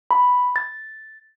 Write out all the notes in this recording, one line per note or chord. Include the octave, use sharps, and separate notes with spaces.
B5
A6